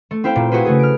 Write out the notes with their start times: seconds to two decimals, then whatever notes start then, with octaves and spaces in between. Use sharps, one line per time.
0.11 A3
0.24 C4 E4 C5 F5 G5
0.36 A#2
0.51 E4 F#4 G#4 B4 C5
0.65 C#3 A3 G#4
0.79 F6 D7